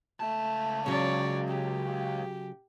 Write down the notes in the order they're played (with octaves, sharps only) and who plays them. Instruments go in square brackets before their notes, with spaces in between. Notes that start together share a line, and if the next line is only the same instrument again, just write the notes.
[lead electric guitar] C#2 A5 [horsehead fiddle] A3
[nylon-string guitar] C#3 F#3 [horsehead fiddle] C#5 D5
[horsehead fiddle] G4